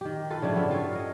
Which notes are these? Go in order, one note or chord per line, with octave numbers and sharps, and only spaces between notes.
D#3 G4
F4 A4 B4
C#3 F3 D4 E4
G2 B3 C4 E5
F4 A4 C#5
A#4 D#5